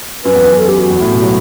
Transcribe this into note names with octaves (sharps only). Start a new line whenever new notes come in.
F#2 B4
E2
F#2
A4
G4
F#4
E2
A2
B2
F#3